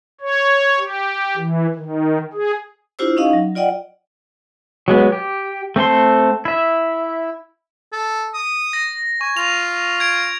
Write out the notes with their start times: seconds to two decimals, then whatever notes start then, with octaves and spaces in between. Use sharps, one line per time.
0.21 C#5
0.79 G4
1.37 E3
1.75 D#3
2.33 G#4
2.99 D4 E4 F4 G4 C5 E6
3.17 C#4 D#4 D#5 F5
3.33 F#3
3.55 F4 D5 D#5 F#5 G5
4.88 F#3 G#3 B3
5.12 G4
5.76 A3 C4 A4 C6
6.45 E4 E5
7.92 A4
8.34 D#6
8.73 A#6
9.21 G#5 C#6
9.37 F4 F7
10.00 G#6 D7